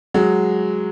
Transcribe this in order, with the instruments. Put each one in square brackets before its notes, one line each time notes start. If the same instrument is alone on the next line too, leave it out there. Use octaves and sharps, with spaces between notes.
[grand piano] F#3 G#3